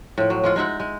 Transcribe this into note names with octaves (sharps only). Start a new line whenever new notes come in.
A2 F3
F#3
F3 G#3 F4
G#3 D#4 E5 F#5
G#3